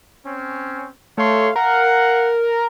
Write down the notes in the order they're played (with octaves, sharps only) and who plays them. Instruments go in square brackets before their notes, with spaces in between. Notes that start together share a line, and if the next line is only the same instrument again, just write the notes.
[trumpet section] C4 C#4
[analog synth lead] A3 [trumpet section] C#5 F5 C6
[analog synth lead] A#4 [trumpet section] F5 F#5